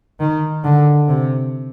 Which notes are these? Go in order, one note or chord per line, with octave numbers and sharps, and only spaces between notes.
D#3
D3
C3